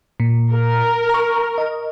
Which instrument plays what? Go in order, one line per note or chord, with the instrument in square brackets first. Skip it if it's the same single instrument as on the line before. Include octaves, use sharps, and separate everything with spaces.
[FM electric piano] A#2
[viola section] A#4
[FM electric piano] A#5 C#6
D#5